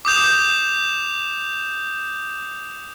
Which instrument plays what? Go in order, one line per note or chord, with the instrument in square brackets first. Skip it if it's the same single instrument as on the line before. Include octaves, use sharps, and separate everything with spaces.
[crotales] D6 D#6 G6 F7